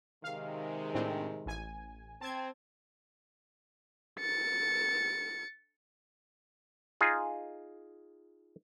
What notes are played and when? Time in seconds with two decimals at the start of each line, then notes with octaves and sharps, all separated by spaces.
0.24 C3 D#3 G#3 F5
0.94 A2 C4 D4
1.46 A1 G#5
2.21 C4 A5 G#6
4.20 A6 C#7
7.01 D#4 F4 G#4